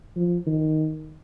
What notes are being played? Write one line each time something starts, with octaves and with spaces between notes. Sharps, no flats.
F3
D#3